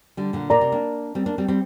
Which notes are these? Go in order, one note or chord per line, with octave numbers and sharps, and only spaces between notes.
D3 G3
A#2 D3
A#2 A#4 D5 A#5
C3
A#3 D4
G3 C4
A#3 D4
G3 C4
G3 C4